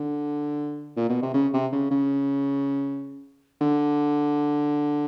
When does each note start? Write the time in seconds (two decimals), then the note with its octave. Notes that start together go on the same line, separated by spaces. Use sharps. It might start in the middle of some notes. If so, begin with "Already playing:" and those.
Already playing: D3
0.97 A#2
1.09 B2
1.22 C3
1.34 C#3
1.54 C3
1.72 C#3
1.91 C#3
3.61 D3